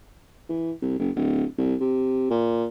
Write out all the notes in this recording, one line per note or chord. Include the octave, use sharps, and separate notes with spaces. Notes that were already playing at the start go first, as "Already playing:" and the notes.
E3
C2
F#1
D1
C2
C3
A#2